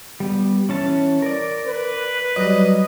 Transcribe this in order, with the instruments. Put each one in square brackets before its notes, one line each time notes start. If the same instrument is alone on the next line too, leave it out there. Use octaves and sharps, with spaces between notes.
[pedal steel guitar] G3 B3
E3 C#4 A5
A#4 D5
[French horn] B4
[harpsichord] F#3 G3 [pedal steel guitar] D#5